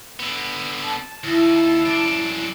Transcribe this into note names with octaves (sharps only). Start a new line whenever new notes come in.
D3 B3
A5
D#2 E4
F#2 D4